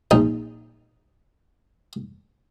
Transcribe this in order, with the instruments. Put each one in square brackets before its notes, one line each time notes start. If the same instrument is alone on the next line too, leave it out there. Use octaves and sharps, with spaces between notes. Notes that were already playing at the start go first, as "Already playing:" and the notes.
[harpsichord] A#1 D#4